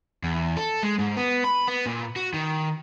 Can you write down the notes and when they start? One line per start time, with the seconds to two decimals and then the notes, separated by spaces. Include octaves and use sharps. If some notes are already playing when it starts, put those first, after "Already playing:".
0.24 E2
0.57 A4
0.83 G#3
0.99 G#2
1.17 B3
1.45 B5
1.68 B3
1.86 A#2
2.16 F#4
2.34 D#3